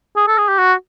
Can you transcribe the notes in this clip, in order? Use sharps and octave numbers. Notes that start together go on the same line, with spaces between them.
G#4
A4
G#4
G4
F#4